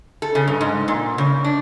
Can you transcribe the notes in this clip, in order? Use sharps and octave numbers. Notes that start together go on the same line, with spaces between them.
A4
C#3
G2
G#2
A#2
C#3
D4